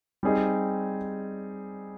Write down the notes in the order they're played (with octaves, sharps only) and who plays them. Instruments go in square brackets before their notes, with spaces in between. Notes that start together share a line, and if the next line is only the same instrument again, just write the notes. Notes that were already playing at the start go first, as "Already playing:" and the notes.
[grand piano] G3 C4 D#4 G#4